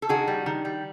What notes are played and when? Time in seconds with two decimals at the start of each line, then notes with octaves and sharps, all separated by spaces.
0.02 A4
0.09 D#3 F#4 G#4
0.28 G3
0.46 D#3
0.65 G3